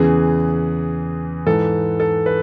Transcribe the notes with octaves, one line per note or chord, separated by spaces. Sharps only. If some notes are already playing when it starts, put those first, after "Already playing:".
Already playing: E2 C#3 E3 G#4
G#2 E3 A4
A4
B4